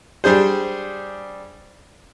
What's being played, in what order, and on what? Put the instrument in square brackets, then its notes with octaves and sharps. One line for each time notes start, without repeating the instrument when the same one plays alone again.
[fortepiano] G3 D4 G#4 C5